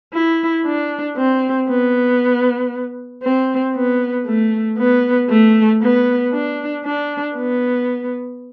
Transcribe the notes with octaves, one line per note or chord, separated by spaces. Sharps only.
E4
D4
C4
B3
C4
B3
A3
B3
A3
B3
D4
D4
B3